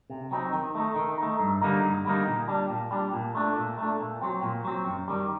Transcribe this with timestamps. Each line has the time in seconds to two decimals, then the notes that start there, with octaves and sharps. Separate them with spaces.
0.10 C3
0.31 F#3 C4 D#4
0.53 D#3
0.75 A3 D#4
0.96 D#3
1.18 A3 D#4
1.39 G2
1.62 D3 G3 A#3 D#4
1.83 G2
2.05 D3 G3 A#3 D#4
2.27 A#2
2.48 G3 D4
2.70 A#2
2.91 G3 D4
3.13 A#2
3.35 A3 D4
3.56 A#2
3.78 A3 D4
4.00 A#2
4.21 F#3 C4
4.43 A#2
4.65 F#3 C4
4.86 F#2
5.08 D#3 G3